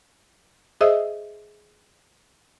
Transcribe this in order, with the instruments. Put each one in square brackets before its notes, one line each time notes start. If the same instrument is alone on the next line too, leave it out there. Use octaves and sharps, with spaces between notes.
[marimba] G#4 C5 D#5 E5 D#6 E6